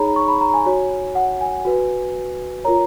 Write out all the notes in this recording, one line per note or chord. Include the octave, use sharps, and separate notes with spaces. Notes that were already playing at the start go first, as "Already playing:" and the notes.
Already playing: D#4 G#4 C#5 A#5 B5
C#6
B5
A#5
G#5
F#4 C#5
F#5
G#5
F#4 B4
F4 A#4 C#5 A#5